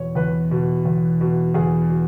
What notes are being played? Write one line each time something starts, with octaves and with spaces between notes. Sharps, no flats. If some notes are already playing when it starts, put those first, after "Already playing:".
Already playing: E2 B2 C#5
E2 B4
B2
E2
B2
E2 G#4
B2